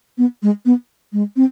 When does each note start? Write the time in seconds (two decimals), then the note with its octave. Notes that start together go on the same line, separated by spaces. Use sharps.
0.18 B3
0.43 G#3
0.66 B3
1.13 G#3
1.36 C4